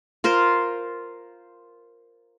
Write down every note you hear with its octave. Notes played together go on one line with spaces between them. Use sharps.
F4 A#4 C5